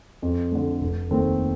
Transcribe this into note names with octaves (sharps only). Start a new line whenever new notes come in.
F2
D3 A3
F1
D#2 D#3 A3 C4